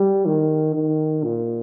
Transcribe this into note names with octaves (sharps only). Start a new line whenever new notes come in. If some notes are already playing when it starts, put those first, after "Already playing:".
Already playing: G3
D#3
D#3
A#2